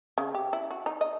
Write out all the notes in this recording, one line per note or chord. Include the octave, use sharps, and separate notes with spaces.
C#3
G4
E4
F#4
D#4
D#5